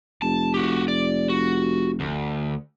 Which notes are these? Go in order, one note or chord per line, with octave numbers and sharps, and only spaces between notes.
F1 A5
F#4 G4
D5
F#4
D2